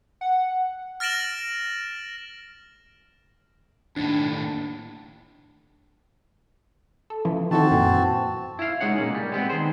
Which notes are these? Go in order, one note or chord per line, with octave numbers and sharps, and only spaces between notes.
F#5
F6 A6 A#6 D7 E7 F#7
D#2 A2 D4
A4
C#3 E3 F3
D#3 E3 C4 F#4 A4 A5
F#2 A#2 E3
E4 F5
C#2 G#2 G#3 D#4 C#5 F#5
A#2 A#3 C#4
G3
G#3 B3 C4
D#3 G#4 C5